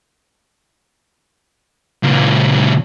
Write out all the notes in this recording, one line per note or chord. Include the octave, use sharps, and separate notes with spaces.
C#2 A#2